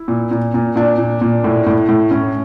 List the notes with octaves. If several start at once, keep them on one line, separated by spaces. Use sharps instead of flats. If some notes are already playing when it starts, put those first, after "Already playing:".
Already playing: E4
A#2
A#2
A#2
A#2 D4
A#2
A#2
A2
A2
A2
A2 C#4